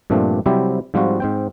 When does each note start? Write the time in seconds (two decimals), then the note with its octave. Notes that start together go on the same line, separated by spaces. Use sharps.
0.10 G2 A#2 F3 A3 C4 D4
0.46 C3 F#3 G3 C4 E4 G4
0.94 G#2 F3 G3 C4 F4 F#4
1.20 G#2 C4 G5